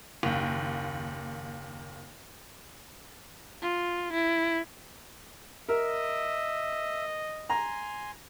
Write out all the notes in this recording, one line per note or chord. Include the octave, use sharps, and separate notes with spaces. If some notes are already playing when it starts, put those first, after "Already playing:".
F#1 D#2
F4
E4
A#4 D#5 E5
G#5 A#5 C6